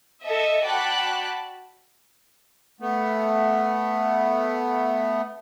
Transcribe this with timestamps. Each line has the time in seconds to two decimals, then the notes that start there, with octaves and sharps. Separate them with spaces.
0.22 A4 D#5 E5
0.65 F#4 D5 G5 A5 B5 F#6
2.80 A3 B3